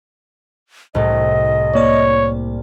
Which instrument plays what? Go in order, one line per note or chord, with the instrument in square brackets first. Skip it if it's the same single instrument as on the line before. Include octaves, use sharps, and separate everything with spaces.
[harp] C2 A2 A3 [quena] D#5
[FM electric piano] A#3 D5 [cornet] C#5